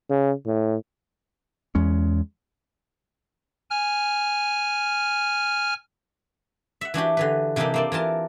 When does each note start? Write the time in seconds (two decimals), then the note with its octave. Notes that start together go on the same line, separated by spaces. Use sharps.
0.10 C#3
0.46 A2
1.75 E2 G#3 C#4
3.70 G#5 F6
6.81 E5 F#5
6.94 E3 D4 F#4 G4
7.17 D3 E3 B4
7.56 C3 E3 A#3 D4 D#4 G4
7.74 A#3 C4 D5
7.92 E3 F4 A#4 A5